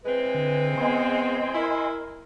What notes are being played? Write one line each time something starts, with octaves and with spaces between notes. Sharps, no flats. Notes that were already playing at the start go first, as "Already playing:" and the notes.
E3 G#3 C4 B4
D3
B3 D#5 G#5 C6
E4 A#4